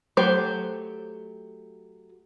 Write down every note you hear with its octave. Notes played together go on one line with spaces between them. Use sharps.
F#3 A3 G4 C5